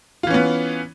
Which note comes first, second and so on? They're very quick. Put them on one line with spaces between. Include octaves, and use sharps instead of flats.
F4 E3 C#4 B3